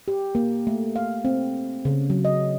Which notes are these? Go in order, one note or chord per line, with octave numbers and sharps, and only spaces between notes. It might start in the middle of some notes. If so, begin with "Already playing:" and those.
G4
A#3
A3
F5
C4
C#3
F#3
D#5